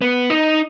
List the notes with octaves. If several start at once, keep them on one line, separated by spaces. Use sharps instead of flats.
B3
D#4